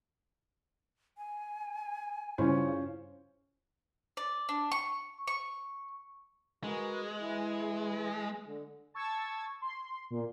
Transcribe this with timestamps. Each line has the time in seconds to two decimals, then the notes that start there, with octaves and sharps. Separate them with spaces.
1.18 G#5
2.38 G2 C#3 C#4 E4 F4 C5
4.17 D5
4.49 D4
4.72 C#6
5.27 C#6
6.64 G#3 F#4 A#4 B4
7.20 E3 E4
8.47 D3
8.94 A5 C#6 E6 G#6 A6
9.62 C6
10.10 A#2